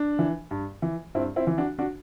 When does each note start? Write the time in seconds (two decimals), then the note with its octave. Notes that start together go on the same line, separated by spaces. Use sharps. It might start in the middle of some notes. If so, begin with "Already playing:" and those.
Already playing: D4
0.19 E3
0.51 G2
0.82 E3
1.15 G2 C4 E4
1.36 C4 E4
1.47 E3
1.58 D4 F#4
1.79 D4 F#4